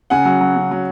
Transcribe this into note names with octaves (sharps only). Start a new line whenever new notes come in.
C#3 F#5 G#5
F#3
F#3
C#3
F#3